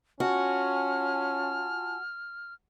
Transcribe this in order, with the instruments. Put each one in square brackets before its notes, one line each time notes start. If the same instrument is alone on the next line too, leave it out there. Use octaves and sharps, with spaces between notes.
[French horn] C#4 [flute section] F4 G#5 A5 [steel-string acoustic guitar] F#4 [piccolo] F6